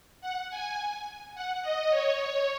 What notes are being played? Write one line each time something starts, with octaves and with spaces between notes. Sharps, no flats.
F#5
G#5
F#5
D#5
C#5